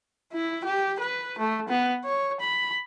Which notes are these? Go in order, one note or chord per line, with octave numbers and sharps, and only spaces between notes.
E4
G4
B4
A3
B3
C#5
B5